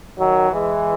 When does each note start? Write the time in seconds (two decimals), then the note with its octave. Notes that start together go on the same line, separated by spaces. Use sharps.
0.18 D#3 F#3
0.49 E3 G#3